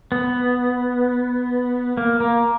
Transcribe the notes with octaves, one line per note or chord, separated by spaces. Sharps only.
B3
A#3
A#3